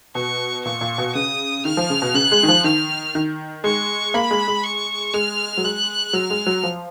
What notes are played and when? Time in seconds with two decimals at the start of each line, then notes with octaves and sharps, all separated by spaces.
0.15 B2 C#6
0.65 A#2 C#6
0.81 A#2
0.98 B2
1.15 C#3 D#6
1.65 D#3 F6
1.77 F3
1.90 C#3
2.02 B2
2.14 C#3 F#6
2.32 G#3
2.43 D#3
2.48 F3
2.64 D#3 F6
3.15 D#3
3.64 G#3 C#6
4.14 A#3 B5
4.31 G#3
4.48 G#3
4.64 C#6
5.14 G#3 F6
5.58 F#3
5.64 G#3 F#6
6.13 F#3 F6
6.30 G#3
6.46 F#3
6.63 F3